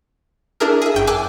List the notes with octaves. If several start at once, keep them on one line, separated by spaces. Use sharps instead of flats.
D4 E4 G#4 A#4
G#4 E5
G1 F#2 G5
G#5 D6 E6 F#6